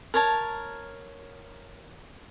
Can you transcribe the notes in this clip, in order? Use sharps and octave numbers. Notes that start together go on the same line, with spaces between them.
A#4 C#5 A5